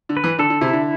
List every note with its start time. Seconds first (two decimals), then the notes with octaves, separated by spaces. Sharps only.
0.09 D3
0.17 B4
0.24 E3
0.39 D3 A4
0.50 D3
0.61 C3 E4
0.73 D3